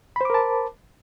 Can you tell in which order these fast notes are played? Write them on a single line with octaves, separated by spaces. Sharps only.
B5 C5 D6 A#4 A5